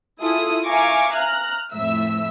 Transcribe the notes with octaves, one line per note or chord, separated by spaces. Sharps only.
E4 F4 G#4 A4 D#6
E5 F5 G#5 A#5 C#6 D6
A#5 F6 F#6
F2 A2 E5 E6